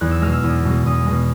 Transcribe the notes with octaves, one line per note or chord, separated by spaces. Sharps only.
E2 F#6
E6
B2 G#3 F6
E6
E2
B2 G#3
E2 D#6
B2 G#3